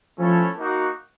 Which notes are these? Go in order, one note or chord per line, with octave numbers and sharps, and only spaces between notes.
F3 A3 C#4 E4 A4 C#5
A#3 D#4 F#4